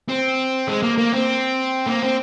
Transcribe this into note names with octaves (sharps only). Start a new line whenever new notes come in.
C4
G#3
A#3
A#3
C4
A#3
C4